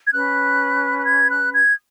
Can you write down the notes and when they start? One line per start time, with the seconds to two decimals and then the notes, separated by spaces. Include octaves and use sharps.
0.07 G#6
0.13 C#4 B4 F#6
0.98 F#6
1.05 G#6
1.28 F#6
1.52 G#6